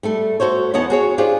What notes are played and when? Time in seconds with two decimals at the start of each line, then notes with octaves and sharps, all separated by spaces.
0.03 G3 A3 A4
0.40 F#4 A4 C5 C#5
0.74 E2 B3 C#5 D#5 F#5 A5
0.90 F#4 G#4 C#5
1.18 D4 F4 G4 G#4 C5 D5